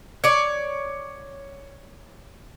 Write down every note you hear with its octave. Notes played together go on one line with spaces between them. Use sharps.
C#5 D5